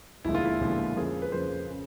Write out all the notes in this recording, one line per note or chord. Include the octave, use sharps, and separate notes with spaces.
E1 D#2 D3 F3 G#3 E4
F4
E4
E1 D#2 D3 F3 G#3
F2 C#3 F3 A#3 G#4
B4
F2 C#3 F3 A#3 C5
C#3